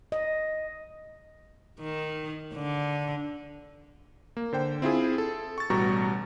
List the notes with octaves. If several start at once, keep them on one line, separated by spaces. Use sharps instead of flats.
D#5
D#3
D3
A#3
D3 C5 G5
C4 E4 F4 G#4
A4
C#6 A6
A1 B2 G3 F#4 A#5 C#6